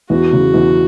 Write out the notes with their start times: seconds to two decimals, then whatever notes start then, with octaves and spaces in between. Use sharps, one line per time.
0.10 E2 F#4
0.33 C#3
0.54 E2